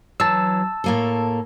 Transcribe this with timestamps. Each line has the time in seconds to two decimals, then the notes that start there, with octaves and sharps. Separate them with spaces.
0.20 E3 F#3 A5 E6
0.84 A2 A#3 A4